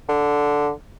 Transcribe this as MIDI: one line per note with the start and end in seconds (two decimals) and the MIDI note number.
0.09 0.70 50